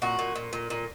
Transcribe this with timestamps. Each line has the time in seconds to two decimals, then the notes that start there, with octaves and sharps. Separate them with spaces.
0.02 A#2 F#4
0.19 A#2
0.35 A#2
0.53 A#2
0.70 A#2